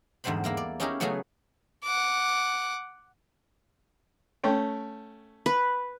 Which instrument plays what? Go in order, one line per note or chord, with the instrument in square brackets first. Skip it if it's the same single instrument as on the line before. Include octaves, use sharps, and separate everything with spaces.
[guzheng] E2 G#2 D3 G3 C5 B5
A#3 E4 A#4
D5
C#4 D#4 E4 G4 G#4 A#4
C#3 F#3 A3 B3 F#4 G#4
[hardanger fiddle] F#5 D6
[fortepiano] A3 C#4 G5
[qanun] B4